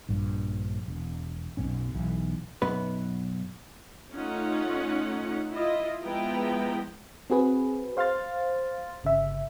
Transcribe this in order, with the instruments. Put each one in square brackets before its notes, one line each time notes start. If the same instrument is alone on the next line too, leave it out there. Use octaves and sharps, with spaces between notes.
[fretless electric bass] A#1 G2
E1
B1 F#2 B2 C#4
B1 E3
[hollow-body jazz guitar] B1 F#2 B3 B4
[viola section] A3 C#4 D#4 F4 F#5
E4 F4 D#5
F3 G#3 B3 E4 G5 A#5
[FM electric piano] C4 F#4 G#4 B4
C5 F5 C6 F6 A6
G1 C#3 E5